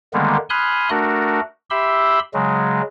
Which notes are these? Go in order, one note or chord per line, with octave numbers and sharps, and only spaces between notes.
D3 D#3 G3 G#3 A#3 B3
G#5 B5 C6 D#6 F6 F#6
A3 D4 F#4 A#4
G4 E5 B5 C6 E6
C#3 F#3 G#3